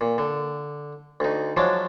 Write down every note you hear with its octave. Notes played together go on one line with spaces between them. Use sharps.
A#2
D3
D2 D#4
F3 F#3 G#3 D4